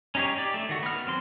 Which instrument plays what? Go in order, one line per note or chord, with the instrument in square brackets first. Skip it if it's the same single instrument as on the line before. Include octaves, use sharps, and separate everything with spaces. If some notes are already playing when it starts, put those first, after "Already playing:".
[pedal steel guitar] C#4 D#4 G4 G#4 C#5
G4 D5
A3
D#3 F#4
B3 F6
F#3 C4 C6